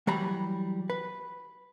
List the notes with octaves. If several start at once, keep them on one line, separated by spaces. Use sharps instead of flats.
E3 F#3 G3 A#5 B5
B4